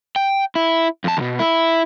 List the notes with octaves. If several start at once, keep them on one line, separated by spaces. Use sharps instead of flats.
G5
E4
F2 A5
D#2 B2
E4